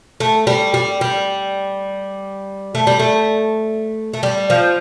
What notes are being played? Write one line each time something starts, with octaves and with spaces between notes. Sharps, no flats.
A3
G3
G3
G3
A3
G3
A3
A3
G3
F3